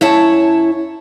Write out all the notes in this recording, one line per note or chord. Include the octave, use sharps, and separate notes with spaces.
F#2 E4 C#5 A5